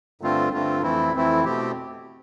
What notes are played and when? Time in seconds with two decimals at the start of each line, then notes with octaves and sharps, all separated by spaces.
0.21 G2 D3 A3 C4 F4
0.53 G2 D3 A3 C4 F4
0.82 F2 E3 A3 C4 E4
1.13 F2 E3 A3 C4 E4
1.45 B2 A3 C4 G4